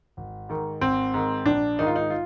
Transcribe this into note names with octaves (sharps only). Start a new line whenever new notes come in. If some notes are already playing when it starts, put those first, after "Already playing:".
G#1
G#2 D#3
G#1 C4
G#2 D#3
A#1 D4
G#2 D#3 D#4
F4
D#4
F4